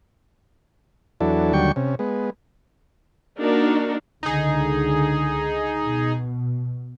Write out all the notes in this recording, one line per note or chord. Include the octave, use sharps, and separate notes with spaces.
E2 F#3 D4 E4 A4
D#2 D3 F#3 G3 G5 C#6
C3 C#4
G#3 B3
A#3 D4 D#4 F#4 A#4
C#2 D3 D#4 G#4
B2